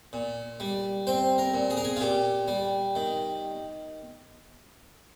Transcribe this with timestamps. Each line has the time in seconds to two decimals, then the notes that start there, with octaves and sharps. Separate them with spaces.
0.13 A#2
0.60 G3
1.07 C4 C5
1.38 A#4
1.54 A#2
1.70 G#4
1.77 A#4
1.84 G#4
1.96 F4
2.01 A#2 G4
2.48 G3
2.96 D#3